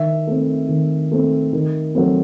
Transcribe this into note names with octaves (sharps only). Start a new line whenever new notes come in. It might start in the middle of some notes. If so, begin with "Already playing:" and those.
Already playing: D#3 E5
A3 C4
D#3
A3 C4
D#3
F#3 A3 C4